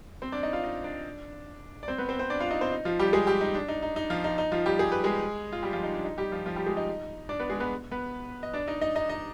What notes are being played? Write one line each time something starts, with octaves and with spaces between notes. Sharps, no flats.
C4 C5
D4 D5
D#4 D#5
F4 F5
D#4 D#5
D4 D5
D5
C4 C5
B3 B4
C4 C5
C4 C5
D4 D5
F4 F5
D#4 D#5
C4 C5
D#4
F3 F4
G3 G4
G#3 G#4
G3 G4
D#4
D4
D#4
D#4
D#4
F3 F4
D#4
D#4
F3 F4
G3 G4
G#4
B4
G#3 G#4
F4
G3 G4
F3 F4
D#4
D4
D#4
G3 G4
F3 F4
F3 F4
G3 G4
G#3 G#4
D#4 D#5
D4 D5
B3 B4
G#3 G#4
B3 B4
B3 B4
D#5
D4 D5
D#4 D#5
D#4 D#5
D#4 D#5
D#4 D#5